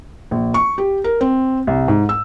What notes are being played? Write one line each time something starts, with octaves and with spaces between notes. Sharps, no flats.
A#1
C#6
G4
A#4
C4
C2
G#2
E6